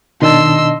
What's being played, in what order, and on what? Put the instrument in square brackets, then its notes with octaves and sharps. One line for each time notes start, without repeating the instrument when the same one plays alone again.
[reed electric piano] B2 D4 A5 [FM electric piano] D#3 [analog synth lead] D#5 [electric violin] C6 E6